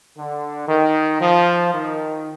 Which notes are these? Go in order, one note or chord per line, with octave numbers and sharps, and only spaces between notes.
D3
D#3
F3
D#3